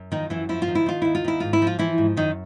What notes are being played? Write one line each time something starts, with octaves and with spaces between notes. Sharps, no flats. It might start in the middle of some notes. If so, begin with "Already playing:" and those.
Already playing: F#2
D#3 F3 D#4
F#2 E3 E4
F3 E4
F4
D#3
E4
D#3 F4
D#2 E4
F4
D#3 E4
G#2 F4
E4
F3 F4
E3 F3 E4
G#2
F#2 D#3 D#4